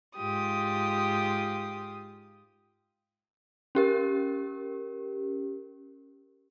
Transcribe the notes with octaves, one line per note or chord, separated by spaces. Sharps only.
G#2 F4 G4 D#6
C#4 G4 A#4